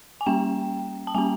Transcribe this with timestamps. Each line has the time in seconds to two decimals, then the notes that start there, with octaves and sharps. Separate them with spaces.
0.21 G#5
0.26 G3 A#3 C#4 G5
1.07 A5
1.14 G3 A#3 C#4 G#5